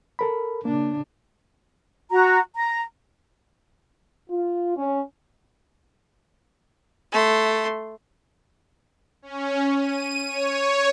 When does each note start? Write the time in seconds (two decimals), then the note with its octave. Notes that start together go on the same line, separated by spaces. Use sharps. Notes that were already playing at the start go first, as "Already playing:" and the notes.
0.19 A4 A#4 B5
0.65 C#3 A#3 D4
2.11 F#4 A#5
2.56 A#5
4.29 F4
4.77 C#4
7.12 A3 C6
9.22 C#4
9.79 D#7
10.25 C#5